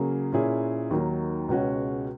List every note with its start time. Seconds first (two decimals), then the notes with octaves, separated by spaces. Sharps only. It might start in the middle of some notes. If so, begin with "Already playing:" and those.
Already playing: C#3 F#3 A#3 C#4 G#4
0.33 A#2 A#3 C#4 E4 G#4
0.90 D#2 D#3 F#3 A#3
1.48 C#2 B2 G#3 C#4 F#4